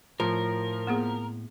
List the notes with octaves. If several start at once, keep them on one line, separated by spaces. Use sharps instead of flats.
A2 F3 A#4
A#3 B3 G#4